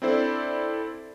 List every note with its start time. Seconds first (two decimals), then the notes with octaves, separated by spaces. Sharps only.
0.02 C4 D4 E4 A4 C5 D5